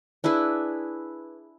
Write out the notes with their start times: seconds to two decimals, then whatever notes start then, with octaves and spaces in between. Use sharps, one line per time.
0.24 D4 E4 G#4 B4